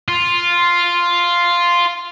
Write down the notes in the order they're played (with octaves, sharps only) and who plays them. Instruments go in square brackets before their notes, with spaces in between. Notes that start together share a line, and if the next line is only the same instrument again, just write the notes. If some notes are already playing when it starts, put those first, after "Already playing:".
[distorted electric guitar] F4